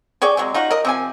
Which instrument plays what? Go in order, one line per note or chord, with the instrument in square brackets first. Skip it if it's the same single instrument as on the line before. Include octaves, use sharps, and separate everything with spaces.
[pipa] G#4 C#5 D5 G5
C3 F#3 G#3
D#4 F4 F#4
A#4 D#5
C3 F3 G#5